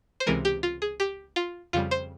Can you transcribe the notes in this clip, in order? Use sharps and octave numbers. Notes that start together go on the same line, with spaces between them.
C5
C#2 C3 E3 G#3 A#4
G4
F4
G#4
G4
F4
F2 C#3 G3 F4
C5